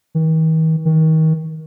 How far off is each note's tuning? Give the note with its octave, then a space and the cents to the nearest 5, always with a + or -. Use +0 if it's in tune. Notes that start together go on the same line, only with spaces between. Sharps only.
D#3 +45
D#3 +30